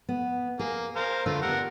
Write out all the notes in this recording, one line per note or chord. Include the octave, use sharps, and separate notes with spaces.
B3
A#3 G#4
A#4 C5 F5
D3 A3 D4 F4 B4
B3 G4 A#4 F#5